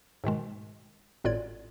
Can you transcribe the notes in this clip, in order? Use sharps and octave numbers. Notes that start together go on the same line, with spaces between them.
G#2 B2 D#3 G#3
G#1 A2 F4 D5 G#6